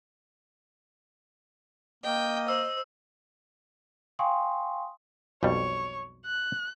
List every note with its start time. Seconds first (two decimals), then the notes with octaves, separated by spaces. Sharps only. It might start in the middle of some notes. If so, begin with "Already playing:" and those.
2.04 A#3 D#5 G5
2.48 C5 E6
4.19 F5 G5 G#5 C6 C#6 D#6
5.43 B1 F2 G3 C#5
6.25 F#6